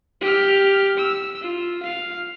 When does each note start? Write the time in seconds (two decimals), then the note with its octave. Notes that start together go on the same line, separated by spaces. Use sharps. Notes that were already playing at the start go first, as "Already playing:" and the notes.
0.21 G4 F6
0.97 E6
1.42 F4
1.83 F5